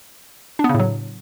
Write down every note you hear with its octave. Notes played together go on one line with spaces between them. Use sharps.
D4
B3
C#3
A2
F#3